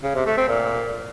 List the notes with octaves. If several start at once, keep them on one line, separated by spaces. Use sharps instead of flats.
C#3
C3
A3
C4
A#2